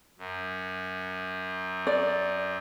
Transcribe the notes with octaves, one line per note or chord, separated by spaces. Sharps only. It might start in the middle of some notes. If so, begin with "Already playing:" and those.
F#2
D5